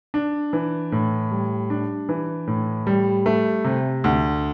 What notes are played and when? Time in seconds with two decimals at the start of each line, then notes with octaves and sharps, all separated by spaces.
0.14 D4
0.53 E3
0.92 A2
1.31 G3
1.70 D4
2.09 E3
2.47 A2
2.87 G3
3.26 A3
3.64 C3
4.04 D2